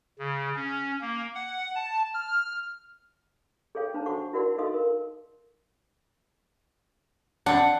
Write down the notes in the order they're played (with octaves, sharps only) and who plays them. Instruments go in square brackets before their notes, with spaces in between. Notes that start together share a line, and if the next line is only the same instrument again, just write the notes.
[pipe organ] C#3
C#4
A#3
F#5
A5
F6
[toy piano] G#4 A4 C#5 F5 G5
D4 C5 C#5 A5
F#4 A4 C5 F#5 C#6
E4 F#4 A#4 D5 F#5 C6
D#4 A4 D#5 F5 C6 D#6
A#4
[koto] C4 D4 [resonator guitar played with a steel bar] F#5